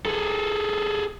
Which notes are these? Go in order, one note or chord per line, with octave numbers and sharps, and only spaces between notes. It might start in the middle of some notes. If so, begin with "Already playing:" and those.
G#4 A4